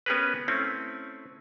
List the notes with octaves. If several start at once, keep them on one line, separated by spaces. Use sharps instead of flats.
B3 C#4 G4 G#4 A#4 B4
A3 C4 C#4 E4